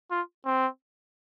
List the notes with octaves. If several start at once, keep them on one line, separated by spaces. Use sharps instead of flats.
F4
C4